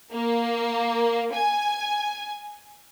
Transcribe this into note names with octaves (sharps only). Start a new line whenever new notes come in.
A#3
G#5